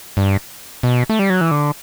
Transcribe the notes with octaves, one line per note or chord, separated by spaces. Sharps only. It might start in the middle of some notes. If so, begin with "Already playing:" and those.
G2
B2
A3
G3
F#3
E3
D3